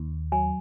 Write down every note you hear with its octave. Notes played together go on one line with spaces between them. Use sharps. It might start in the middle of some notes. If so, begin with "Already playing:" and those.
Already playing: D#2
F#3 G#5